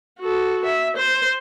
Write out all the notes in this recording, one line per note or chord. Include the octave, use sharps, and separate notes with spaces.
F#4 A4
E5
C5